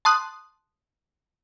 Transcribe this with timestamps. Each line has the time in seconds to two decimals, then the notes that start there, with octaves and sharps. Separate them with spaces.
0.05 A5 C6 D#6 F#6